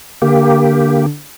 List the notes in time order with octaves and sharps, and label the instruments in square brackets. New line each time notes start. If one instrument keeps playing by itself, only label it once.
[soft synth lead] D3 [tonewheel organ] A#3 G4